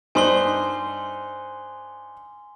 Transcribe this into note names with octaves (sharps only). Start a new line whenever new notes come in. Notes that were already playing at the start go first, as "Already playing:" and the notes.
G2 D#4 C5 G#5 C6 G7